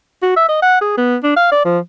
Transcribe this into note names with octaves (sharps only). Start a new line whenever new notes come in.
F#4
E5
D#5
F#5
G#4
B3
D4
F5
D5
F3